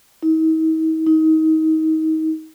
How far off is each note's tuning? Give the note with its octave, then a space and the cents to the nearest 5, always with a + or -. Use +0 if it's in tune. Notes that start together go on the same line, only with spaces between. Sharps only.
D#4 +45
D#4 +30